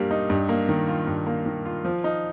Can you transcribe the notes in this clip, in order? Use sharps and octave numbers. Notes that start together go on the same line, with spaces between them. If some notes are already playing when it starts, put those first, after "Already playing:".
Already playing: G2 G3 A#3
D#4
G2
A#3
D#3
F4
G2
A#3
D#3
F4
F3
D#4